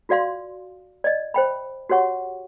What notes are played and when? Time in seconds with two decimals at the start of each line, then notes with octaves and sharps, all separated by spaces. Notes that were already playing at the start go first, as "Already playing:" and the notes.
0.09 F4 F#4 D5 F5 C6
1.04 D5 D#5
1.34 C5 G5 B5
1.90 F#4 G4 C#5 F#5 C#6